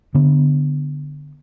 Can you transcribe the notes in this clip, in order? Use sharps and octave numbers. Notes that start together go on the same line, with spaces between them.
D3 B3